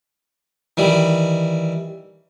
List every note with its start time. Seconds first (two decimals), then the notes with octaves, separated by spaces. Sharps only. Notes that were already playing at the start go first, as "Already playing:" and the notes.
0.77 D#3 E3 G3